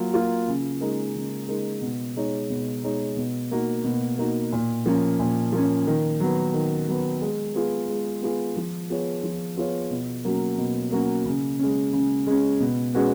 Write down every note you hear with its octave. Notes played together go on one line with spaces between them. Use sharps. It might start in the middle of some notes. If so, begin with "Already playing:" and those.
Already playing: F#3 A#3 F4
A#3 F4
C#3
G#3 D#4 A#4
C#3
G#3 D#4 A#4
B2
G#3 D#4 G#4 C#5
B2
G#3 D#4 G#4 C#5
B2
A#3 D#4 F#4
B2
A#3 D#4 F#4
A#2
F3 A#3 C#4
A#2
F3 A#3 C#4
D#3
F#3 B3
D#3
F#3 B3
G#3
B3 F4 G#4
G#3
B3 F4 G#4
F3
B3 F4 G#4 C#5
F3
B3 F4 G#4 C#5
B2
F#3 A#3 C#4 F#4
B2
F#3 A#3 C#4 F#4
C#3
G#3 C#4
C#3
G#3 C#4
B2
G#3 C#4 F#4 B4